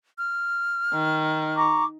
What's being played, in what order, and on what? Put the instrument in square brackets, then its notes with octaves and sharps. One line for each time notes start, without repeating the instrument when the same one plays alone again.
[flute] F6
[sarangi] D#3
[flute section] A#5 C#6 D6